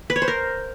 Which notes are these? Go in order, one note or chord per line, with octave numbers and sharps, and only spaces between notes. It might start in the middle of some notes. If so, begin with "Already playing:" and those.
B4
C#5
C5
A#4